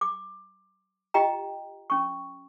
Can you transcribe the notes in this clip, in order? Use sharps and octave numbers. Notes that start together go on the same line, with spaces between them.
D6
F4 G4 D#5 G5 A#5
C#4 C#6